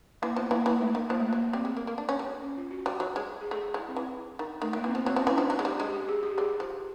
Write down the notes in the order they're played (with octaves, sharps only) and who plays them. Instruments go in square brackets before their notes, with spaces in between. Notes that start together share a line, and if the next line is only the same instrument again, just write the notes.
[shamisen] E3 [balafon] A#3
[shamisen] F3 [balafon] B3
[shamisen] E3 [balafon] A#3
[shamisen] E3 [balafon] A#3
[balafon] A3
[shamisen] D#3
[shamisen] F3 [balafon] A#3
[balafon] A3
A#3
[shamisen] F#3
[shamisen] G3 [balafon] C4
[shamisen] G#3
A#3
A#3
D4
C#4
G3
[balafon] C#4
F4
F#4
[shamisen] G3 [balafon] F#4
[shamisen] F#3
G#3
[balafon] G#4
[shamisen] A3 [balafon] G#4
[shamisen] G#3 [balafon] E4
[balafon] C4
[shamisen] E3
D#3
[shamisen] D#3 [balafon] A3
[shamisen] D#3
[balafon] A#3
[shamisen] E3 [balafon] C4
[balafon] B3
[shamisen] F3
[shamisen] F#3 [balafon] C4
[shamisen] F3 [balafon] C#4
[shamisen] E3
[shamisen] F3 [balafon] D4
[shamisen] F#3 [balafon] D#4
[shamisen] G#3
[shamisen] G3 [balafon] G4
[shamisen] G#3 [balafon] G4
[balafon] G4
G#4
G4
[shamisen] G3 [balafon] G#4
[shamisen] F3